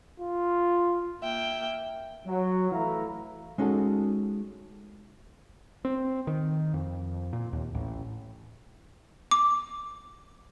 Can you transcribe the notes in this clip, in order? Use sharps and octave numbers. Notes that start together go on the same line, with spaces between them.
F4
A#3 E5 G5
F#3
E3 A3 E4 E5 F5 A#5
G#3 C#4 D#4 F#4 A4
C4
D#3
F2
A#2
D#2
A1
D6